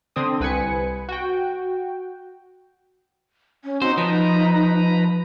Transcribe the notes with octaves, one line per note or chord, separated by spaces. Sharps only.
D3 C4 D#6
C2 B4 G#5 C#7
F#4 G5
C#4
C4 D#4 F#4 C5
F3 B4 A#5